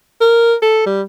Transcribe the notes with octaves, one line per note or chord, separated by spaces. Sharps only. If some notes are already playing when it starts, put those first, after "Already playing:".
A#4
A4
G3